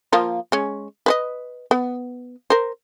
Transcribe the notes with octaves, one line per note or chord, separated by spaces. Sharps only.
F3 A#3 F4
G#3 C#4
B4 C5 D#5
B3
A#4 C5